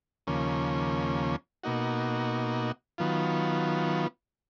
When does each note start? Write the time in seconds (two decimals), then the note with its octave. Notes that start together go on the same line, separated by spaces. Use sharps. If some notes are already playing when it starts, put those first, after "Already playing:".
0.27 D#2 C#3 F3 A#3 C#4
1.63 B2 A#3 D#4 F#4
2.98 D#3 F#3 B3 F4